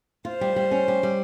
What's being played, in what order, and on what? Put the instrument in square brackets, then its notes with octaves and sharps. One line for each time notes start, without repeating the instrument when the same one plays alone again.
[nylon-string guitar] F4 [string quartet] C5
[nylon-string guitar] G3
G3
C#4
G3
G3